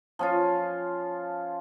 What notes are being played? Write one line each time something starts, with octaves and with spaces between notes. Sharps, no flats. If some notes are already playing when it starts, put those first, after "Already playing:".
F3 C#4 F4